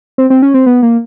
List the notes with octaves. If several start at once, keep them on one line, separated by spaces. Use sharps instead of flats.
C4
C4
C#4
C4
B3
A#3